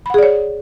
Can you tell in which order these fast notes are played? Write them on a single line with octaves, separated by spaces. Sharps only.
B5 F#5 G#4 D5 C#5